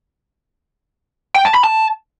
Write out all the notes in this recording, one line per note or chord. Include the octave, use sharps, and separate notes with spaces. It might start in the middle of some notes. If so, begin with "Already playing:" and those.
G5
A5
B5
A5